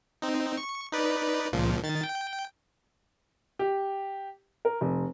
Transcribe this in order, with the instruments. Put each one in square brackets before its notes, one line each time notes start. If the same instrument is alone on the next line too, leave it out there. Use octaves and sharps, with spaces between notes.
[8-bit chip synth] C4 D#4
C#6
D#4 B4 D5
C#2 A#2 F3
D#3 A6
G5
[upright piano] G4
A#4
F1